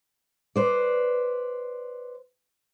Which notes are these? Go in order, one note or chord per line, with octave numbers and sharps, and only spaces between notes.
B4 C5 D5